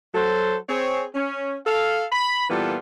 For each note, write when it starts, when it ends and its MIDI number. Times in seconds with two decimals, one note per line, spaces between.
0.14 0.56 54
0.14 0.56 69
0.14 0.56 72
0.69 1.04 60
0.69 1.04 68
0.69 1.04 73
1.15 1.56 61
1.65 2.05 69
1.65 2.05 77
2.12 2.45 83
2.50 2.76 46
2.50 2.76 52
2.50 2.76 55
2.50 2.76 59
2.50 2.76 65
2.50 2.76 69